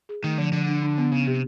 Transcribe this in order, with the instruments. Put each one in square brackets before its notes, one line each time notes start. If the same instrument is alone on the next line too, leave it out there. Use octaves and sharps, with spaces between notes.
[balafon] G#4
[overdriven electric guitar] D#3 [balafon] A3
[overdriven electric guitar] D3 [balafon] F3
[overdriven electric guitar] D3 [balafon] F3
[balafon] D4
D4
B3
[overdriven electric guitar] C#3 [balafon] B3
[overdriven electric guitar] C3 [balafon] G4